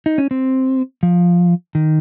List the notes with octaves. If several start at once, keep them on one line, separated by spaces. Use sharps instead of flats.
D#4
C#4
C4
F3
D#3